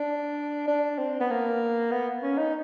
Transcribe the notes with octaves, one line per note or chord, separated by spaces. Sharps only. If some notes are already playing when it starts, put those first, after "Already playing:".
Already playing: D4
D4
C4
B3
A#3
B3
C#4
D#4